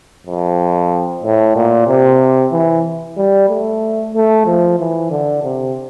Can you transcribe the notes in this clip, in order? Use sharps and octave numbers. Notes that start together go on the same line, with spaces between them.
F2
A2
A#2
C3
E3
G3
A3
A3
F3
E3
D3
C3